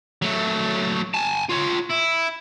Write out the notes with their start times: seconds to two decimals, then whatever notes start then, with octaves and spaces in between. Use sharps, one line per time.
0.22 F#3 A3
1.14 G#5 A5
1.49 F4 C#5
1.90 E4